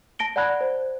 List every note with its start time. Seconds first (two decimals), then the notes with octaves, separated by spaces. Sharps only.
0.19 A5 A#6 D7 G7
0.36 D5 F#5 A5 B5 F#6 G#6
0.61 C5